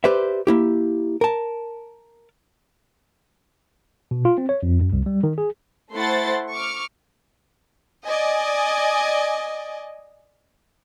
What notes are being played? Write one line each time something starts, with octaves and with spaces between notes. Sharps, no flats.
G4 B4 C5 D5 E5
A#3 E4 G4
A#4 A5
B2
F4
C4
C#5
F2
F#2
C2
G3
D#3
G#4
A3 E4 C5 F#5 C6 A6
C#6 D6 F6
D5 D#5 G#5